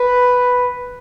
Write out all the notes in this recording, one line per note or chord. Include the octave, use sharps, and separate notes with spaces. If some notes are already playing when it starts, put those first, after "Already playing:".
Already playing: B4